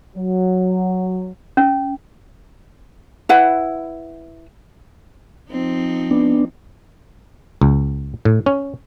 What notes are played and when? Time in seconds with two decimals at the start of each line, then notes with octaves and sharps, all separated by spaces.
0.15 F#3
1.57 C#4
3.29 E4 B4 F#5
5.50 F3 C4 D#4
6.11 B3 D4
7.61 C#2
8.25 A2
8.46 C#4